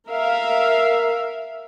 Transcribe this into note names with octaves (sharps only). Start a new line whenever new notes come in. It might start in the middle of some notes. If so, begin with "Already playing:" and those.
A#4 E5 F5